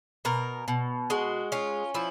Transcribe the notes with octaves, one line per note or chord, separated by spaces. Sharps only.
B2 A#4
B2
G#3 F#4
C#4 F4
F3 E4